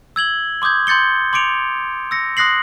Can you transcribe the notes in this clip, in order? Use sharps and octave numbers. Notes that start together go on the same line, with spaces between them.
E6 G#6 F#7 G7
C6 D6 D#6 G6 G#6
C6 G6 A6 C#7 G7
C6 D6 C#7 D7 F7
E6 A#6 C#7
C6 D#6 F#6 A#6 C7 F#7